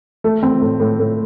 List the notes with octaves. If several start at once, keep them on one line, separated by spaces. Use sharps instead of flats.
A3
C4
A2
A2
A2